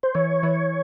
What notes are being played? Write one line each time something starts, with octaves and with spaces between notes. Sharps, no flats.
C5
E3 C#5
E3